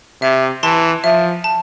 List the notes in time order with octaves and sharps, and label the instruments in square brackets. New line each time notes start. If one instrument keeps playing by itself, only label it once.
[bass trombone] C3 [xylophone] E5
[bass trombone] E3 [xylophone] A5 C6
[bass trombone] F3 [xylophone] E5
[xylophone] A5